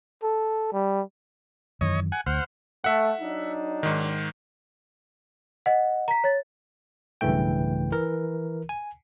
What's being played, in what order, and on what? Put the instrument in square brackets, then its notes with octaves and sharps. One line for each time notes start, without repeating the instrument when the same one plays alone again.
[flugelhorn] A4
G3
[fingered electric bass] F#2 D#3 E3 [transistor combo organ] C#5 D#5
[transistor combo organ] F#5 G#5
[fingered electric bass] D2 [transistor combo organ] C5 F#5 F6
[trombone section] A3 [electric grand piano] E5 F#5
[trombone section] F#3 D4 D#4
[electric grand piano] G#2 D#3
[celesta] D#5 F#5
A#5 B6
C#5 A6
[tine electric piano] B1 G2 C#3 E3 A3 G5
E3 A#4
G#5